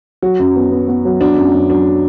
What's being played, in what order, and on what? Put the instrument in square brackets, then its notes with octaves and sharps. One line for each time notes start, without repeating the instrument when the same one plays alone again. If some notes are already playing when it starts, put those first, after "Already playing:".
[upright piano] F#3 [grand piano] F#4
[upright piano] F#2
B3
B3
B3
F#3
[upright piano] F#3 [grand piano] D4
[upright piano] F#2
F#2
[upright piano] F#3 [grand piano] D4